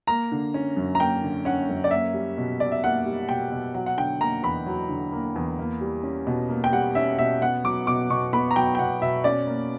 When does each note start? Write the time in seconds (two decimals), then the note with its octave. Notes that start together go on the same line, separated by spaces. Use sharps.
0.07 A#3 A#5
0.32 D3
0.54 C#4
0.77 F#2
0.95 A#5
1.00 A#3 G5
1.23 D3
1.45 C#4 F#5
1.69 F#2
1.84 D5
1.91 A#3 E5
2.14 G3
2.38 B2
2.60 B2 D5
2.72 E5
2.84 A#3 F#5
3.06 G3
3.29 B2 G5
3.52 B2
3.74 F#3 F#5
3.86 F#5
3.97 D3 G5
4.21 A#3 A#5
4.43 E2 B5
4.66 F#3
4.89 D3
5.12 A#3
5.36 E2
5.59 A#3
5.81 G3
6.03 C#4
6.27 B2
6.49 A#3
6.64 G5
6.72 G3 F#5
6.95 C#4 E5
7.19 B2 E5
7.41 B3 F#5
7.64 F#3 D6
7.87 B2 D6
8.10 B2 C#6
8.33 B3 B5
8.51 A#5
8.56 F#3 G5
8.75 G5
8.79 B2 F#5
9.01 B2 E5
9.24 C#4 D5
9.47 A#3